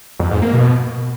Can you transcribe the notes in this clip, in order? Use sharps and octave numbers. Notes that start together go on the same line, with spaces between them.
F2
G#2
A#3
B2